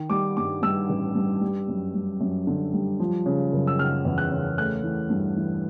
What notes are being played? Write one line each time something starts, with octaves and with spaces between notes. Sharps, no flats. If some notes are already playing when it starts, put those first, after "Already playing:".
Already playing: D#3
G3 D6
G2 D6
G2 E6
A1
G2
G3
F#2
G3
F#2
D3
G3
F3
C#3
F#1
E6
C#3 F6
E2
F#6
C#3
A3 F#6
E3
G2
E3